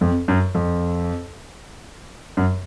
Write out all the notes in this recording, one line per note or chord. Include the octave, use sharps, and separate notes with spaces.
F2
F#2
F2
F#2